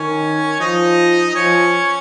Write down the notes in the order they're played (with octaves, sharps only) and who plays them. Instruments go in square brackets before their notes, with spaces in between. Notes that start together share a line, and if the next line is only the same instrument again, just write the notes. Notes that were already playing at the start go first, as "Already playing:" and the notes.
Already playing: [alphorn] D#3 [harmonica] C#4 C#5
[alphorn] F3 [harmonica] D#4 D#5
[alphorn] F3 [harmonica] C#4 C#5